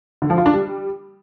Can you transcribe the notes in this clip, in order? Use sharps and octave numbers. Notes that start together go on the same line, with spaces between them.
D3
F3
F4
D4
G3